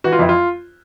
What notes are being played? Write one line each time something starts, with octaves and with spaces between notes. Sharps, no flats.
E3 F#4
F4
F2 E4
F4